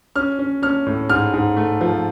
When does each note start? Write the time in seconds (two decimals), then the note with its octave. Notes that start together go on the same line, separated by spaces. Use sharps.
0.16 C#4 F6
0.39 C#4
0.62 C#4 F6
0.87 A2
1.09 G#2 F6
1.34 G#2
1.57 A3
1.81 F3